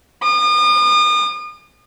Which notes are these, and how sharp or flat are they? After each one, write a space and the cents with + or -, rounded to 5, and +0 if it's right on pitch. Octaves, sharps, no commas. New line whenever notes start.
D#6 -40